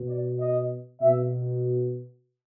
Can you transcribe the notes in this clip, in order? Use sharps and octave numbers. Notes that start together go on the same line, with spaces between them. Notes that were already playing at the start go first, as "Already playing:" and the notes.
Already playing: B2
D5
D#5
B2 E5